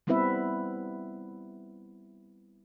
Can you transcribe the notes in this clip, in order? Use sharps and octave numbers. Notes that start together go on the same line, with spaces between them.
G3 B3 C4 E4 B4 E5